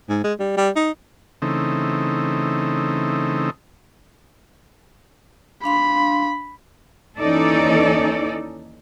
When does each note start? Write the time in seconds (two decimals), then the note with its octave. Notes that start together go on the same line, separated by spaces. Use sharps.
0.09 G#2
0.24 G#3
0.39 G3
0.57 G3
0.76 D#4
1.42 C#3 E3 A3 C4 D#4
5.64 D4 F5 B5 C6
7.19 D#2 E3 C#4 D#4 A4 D5